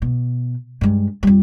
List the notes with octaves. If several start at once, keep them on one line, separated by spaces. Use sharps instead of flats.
B2
G2 G#3
F2 G3